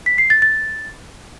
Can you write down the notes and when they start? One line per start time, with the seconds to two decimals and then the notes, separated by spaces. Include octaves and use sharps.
0.06 B6
0.18 C7
0.30 A6
0.42 A6